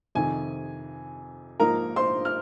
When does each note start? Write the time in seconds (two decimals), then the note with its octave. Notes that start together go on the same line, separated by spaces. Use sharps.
0.15 F2 C3 D#3 G#5
1.60 G#2 F3 A#3 D#4 A#4 A#5
1.96 C5 C6
2.25 F6